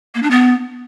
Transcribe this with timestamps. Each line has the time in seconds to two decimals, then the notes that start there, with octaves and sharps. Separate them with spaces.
0.15 A#3
0.23 D4
0.31 B3